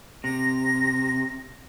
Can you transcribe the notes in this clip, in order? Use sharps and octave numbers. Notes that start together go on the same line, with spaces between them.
C3 A#6